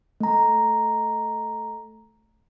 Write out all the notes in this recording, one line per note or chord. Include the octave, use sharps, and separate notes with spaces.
A3 A#5